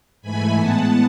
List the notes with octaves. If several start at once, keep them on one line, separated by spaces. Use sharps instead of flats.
G#2 E3 A3 G#5 B5
A2 G#3 B3 F#5 A5